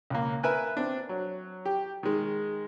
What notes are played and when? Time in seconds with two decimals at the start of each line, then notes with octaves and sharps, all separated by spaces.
0.10 C#2 A#3
0.43 A#4 B4 E5 G#5 F#6
0.77 C4 D4
1.09 F#3
1.65 G4
2.03 D#3 G#3